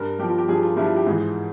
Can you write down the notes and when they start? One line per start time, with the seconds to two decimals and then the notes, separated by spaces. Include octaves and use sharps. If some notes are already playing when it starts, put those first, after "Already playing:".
Already playing: G2 A#4
0.19 G2 F3 G4
0.29 F4
0.38 G4
0.48 G2 F3 G#4
0.63 F4
0.77 G2 F3 E4
0.87 F4
0.96 G4
1.06 G#2 E3 G#4